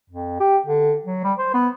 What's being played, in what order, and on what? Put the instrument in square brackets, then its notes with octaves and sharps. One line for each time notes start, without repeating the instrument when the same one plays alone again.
[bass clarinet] F2
G4
D3
F#3
G3
C5
B3